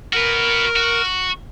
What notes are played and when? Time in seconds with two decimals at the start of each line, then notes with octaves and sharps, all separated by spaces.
0.13 F#4 A#4 B4
0.76 F#4